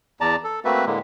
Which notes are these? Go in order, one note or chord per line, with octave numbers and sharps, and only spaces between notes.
E2 D5 A5 A#5
A4
A3 A#3 C4 F#4 B4 E5
A2 D3 G#3 A#3